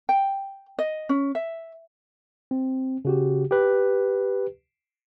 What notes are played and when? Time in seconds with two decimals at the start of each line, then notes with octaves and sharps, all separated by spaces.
0.09 G5
0.79 D#5
1.09 C#4
1.35 E5
2.51 C4
3.05 C#3 F#4 G4
3.51 G4 B4